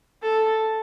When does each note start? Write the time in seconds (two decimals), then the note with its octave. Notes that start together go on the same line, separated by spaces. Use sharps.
0.22 A4